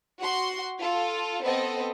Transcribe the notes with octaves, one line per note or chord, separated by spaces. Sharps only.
F#4 F#5 C6
F4 A4
B3 C4 A4 D#5